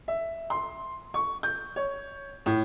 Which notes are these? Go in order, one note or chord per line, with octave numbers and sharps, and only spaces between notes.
E5
C6
C#6
G6
C#5
A2